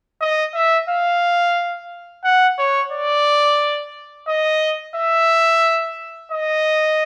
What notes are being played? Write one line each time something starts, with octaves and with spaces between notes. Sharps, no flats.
D#5
E5
F5
F#5
C#5
D5
D#5
E5
D#5